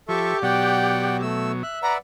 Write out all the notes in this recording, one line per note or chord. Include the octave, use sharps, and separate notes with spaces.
F3 G4 A4 E5 C#6
B2 F#3 D5 F#5 G5
A3 E6
E5 F#6
B4 D5 F#5 A#5